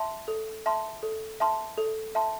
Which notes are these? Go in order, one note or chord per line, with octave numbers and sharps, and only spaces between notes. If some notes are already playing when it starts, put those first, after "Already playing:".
Already playing: E5 A5 C6
A4
E5 A5 C6
A4
E5 A5 C6
A4
E5 A5 C6